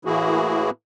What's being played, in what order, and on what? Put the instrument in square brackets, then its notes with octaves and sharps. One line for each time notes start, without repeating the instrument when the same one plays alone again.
[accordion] A2 E3 A#3 E4 F#4 G#4